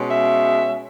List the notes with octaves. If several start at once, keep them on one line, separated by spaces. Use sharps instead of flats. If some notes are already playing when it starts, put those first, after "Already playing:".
Already playing: B2 G#3 C#4
E5